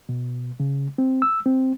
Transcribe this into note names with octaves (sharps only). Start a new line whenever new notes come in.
B2
C#3
C4
E6
C4